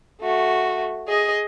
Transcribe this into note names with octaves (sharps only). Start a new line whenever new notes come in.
A3 F#4
G#4 D#5